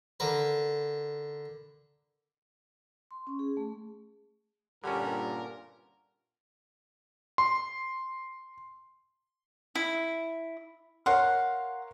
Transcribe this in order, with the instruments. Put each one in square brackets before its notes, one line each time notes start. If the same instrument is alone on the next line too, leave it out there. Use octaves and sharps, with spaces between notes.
[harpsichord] D3 A#4 B4
[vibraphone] C6
C#4
G#4
A3
[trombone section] G2 A#2 [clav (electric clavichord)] D3 C#4 [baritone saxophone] G3 [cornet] A#4
[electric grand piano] C6
[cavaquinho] E4
[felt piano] A#4 C#5 C6 [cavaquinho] F5 F#5